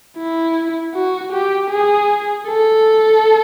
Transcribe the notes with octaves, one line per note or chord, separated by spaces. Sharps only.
E4
F#4
G4
G#4
A4